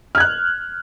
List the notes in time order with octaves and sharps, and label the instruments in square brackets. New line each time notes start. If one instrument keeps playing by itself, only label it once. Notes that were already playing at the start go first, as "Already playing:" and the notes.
[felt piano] F6
G#6
F#6